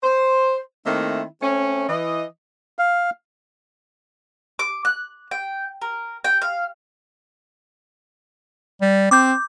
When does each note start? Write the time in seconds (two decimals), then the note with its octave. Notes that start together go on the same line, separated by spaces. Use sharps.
0.04 C5
0.87 D#3 A3 A#3 C4 E4
1.42 A3 C4 C#4
1.89 E3 D#5
2.79 F5
4.59 D6
4.85 F#6
5.31 G5
5.82 A#4
6.24 G5
6.42 F5
8.81 G3
9.11 C4 D6 G6